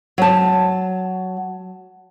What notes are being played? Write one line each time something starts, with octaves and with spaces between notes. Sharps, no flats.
F#3 A5